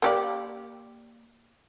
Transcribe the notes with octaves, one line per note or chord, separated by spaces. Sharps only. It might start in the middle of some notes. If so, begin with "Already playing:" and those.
A#3 G4 D5